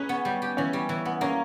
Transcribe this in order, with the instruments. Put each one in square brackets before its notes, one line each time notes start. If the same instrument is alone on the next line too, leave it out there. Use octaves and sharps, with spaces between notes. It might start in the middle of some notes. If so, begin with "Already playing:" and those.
Already playing: [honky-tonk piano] C#4 [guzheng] D#4 G#4 B4
[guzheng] B3
G3
G4
[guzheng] E3 [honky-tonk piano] C#4
[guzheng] G3
E3
B3
[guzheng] A#3 [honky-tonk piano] C#4